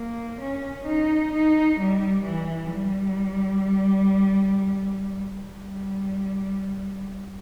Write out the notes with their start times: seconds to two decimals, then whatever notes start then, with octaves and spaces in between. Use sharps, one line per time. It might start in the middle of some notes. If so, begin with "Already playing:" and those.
Already playing: A#3
0.41 C#4
0.86 D#4
1.32 D#4
1.78 G3
2.24 E3
2.71 G3
5.47 G3